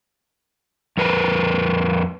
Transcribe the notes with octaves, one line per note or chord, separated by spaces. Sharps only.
F2 A#4 B4